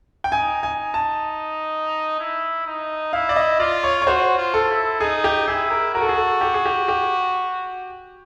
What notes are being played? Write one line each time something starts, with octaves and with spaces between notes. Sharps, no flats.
G5
D#4 G#5
G#5
A5
E4
D#4
E4 F5
D5
D#5
F4 D5
C#5
C#5
F#4 C5
F4
A4
E4
D#4 G#4
G4
E4 G#4
A#4
F#4 A#4
A4
G#4
A4
G4
G#4
G4
G4